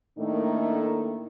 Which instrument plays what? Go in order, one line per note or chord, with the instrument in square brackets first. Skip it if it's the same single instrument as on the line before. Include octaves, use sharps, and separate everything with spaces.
[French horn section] A2 D#3 A3 A#3 D4 D#4